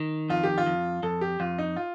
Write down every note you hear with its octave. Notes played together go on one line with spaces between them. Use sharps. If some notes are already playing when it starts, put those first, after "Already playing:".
Already playing: D#3
F2 F4
G4
F4
F2
F2 A4
G4
F2 F4
D#4
F4